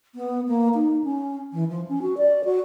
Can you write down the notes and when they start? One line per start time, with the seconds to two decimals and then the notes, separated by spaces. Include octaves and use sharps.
0.15 B3
0.48 A#3
0.74 D#4
1.04 C#4
1.53 E3
1.69 F3
1.89 C#4
2.02 F#4
2.17 D5
2.44 F#4